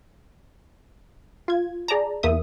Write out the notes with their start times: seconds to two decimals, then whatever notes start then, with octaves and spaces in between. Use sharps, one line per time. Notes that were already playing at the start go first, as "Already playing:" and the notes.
1.48 F4 G#6
1.88 G#4 D5 A5 A#5
2.23 E2 A#3 E5 D#6